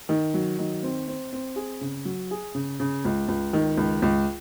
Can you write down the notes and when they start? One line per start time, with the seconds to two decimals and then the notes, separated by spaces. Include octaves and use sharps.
0.09 D#3
0.34 F#3
0.59 D#3
0.83 C4
1.08 C4
1.33 C4
1.56 G#4
1.81 C#3
2.05 F#3
2.31 G#4
2.55 C#3
2.80 C#3
3.05 C#2
3.28 C#2
3.53 D#3
3.77 C#2
4.02 C#2